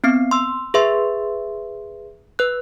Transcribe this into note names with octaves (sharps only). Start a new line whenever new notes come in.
B3 C4 C7
C6 E6
G#4 B4 E5 C6
B4 F#6